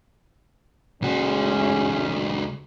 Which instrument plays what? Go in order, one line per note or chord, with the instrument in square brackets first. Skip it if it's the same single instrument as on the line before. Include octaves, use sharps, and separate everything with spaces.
[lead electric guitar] C#2 F#4 [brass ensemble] G#3 A3 C#4